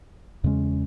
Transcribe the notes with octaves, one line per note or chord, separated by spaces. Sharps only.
E2 C#3 G#3 C#4